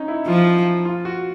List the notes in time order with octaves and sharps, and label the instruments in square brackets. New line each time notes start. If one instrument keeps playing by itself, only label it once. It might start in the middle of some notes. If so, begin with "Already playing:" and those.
Already playing: [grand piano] C#4 D#4
E4
[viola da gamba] F3 [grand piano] F4
[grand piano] F4
F#4